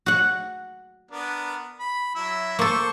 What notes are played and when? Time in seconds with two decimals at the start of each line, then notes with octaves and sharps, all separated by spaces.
0.06 F#4 F#5
1.11 B3 D4 A#4
1.80 B5
2.15 F#3 E4 E5
2.59 A#3 A4 C5 C#6